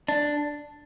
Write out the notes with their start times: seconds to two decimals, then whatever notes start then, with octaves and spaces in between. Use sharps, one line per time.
0.08 D4